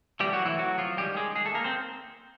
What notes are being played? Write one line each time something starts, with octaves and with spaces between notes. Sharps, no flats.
E3 G3 A3 C4 G4
F#3 F#4
E3 E4
F#3 F#4
F3 F4
D#3 G3 G#3 C#4 G4
G#3 G#4
G#3 G#4
A3 A4
A#3 A#4
C4 C5